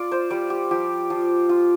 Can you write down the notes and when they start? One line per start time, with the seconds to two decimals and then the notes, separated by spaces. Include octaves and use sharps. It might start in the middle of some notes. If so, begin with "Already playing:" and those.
Already playing: F4 D5
0.12 C5
0.30 G3 D5
0.50 G4
0.71 F3 G4
1.10 F3
1.49 F4